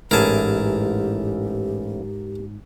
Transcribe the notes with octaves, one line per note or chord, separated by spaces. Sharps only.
A1 G#2 E4 G4 G#4 A#4 A5